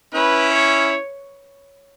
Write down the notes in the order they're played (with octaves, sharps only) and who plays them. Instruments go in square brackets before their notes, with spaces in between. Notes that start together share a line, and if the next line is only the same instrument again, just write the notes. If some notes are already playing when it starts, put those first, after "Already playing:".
[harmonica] C#4 E4 [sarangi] B4
[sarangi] C#5